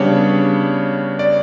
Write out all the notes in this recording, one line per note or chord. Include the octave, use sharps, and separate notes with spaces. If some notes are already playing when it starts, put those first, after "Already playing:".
Already playing: C#3 G3 B3 D4 C#5
D5